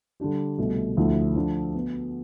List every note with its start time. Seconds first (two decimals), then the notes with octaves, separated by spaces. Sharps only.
0.20 D3 G3 D4 G4
0.58 C2 B2 A3
0.97 D2 D3 F3 A3 E4
1.36 F3 A3 D4
1.75 B3